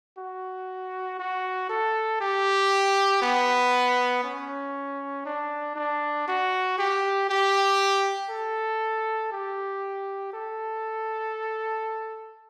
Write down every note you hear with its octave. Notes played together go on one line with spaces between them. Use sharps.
F#4
F#4
A4
G4
B3
C#4
D4
D4
F#4
G4
G4
A4
G4
A4